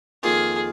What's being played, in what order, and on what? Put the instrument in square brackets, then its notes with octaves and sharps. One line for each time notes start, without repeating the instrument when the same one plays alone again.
[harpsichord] F2 D#3 A#3 F4 [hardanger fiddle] G#4